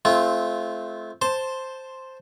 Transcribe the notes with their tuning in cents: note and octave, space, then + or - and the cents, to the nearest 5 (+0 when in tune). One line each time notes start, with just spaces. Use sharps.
A3 -30 C4 +0 F4 -15
C5 +0 A5 +0 C6 +5